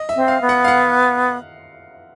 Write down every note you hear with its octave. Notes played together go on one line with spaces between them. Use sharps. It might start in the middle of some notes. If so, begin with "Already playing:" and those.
Already playing: D#5
E5
C4
F5
B3
F#5
F5
F#5